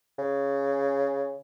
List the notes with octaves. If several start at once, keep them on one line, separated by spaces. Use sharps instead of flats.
C#3